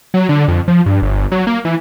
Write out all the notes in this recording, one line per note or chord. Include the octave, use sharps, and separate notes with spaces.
F#3
D3
F2
F3
G2
G1
F#3
A#3
E3